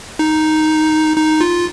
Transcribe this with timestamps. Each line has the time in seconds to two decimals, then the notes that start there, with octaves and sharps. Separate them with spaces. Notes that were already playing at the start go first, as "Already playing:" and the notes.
0.19 D#4
1.17 D#4
1.41 F4